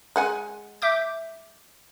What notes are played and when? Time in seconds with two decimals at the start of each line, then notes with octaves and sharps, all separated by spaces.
0.16 G#3 F#5 G#5
0.82 E5 D6 G6